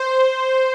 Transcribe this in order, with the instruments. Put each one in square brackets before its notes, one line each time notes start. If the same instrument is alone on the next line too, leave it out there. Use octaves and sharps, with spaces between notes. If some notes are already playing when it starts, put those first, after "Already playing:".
Already playing: [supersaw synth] C5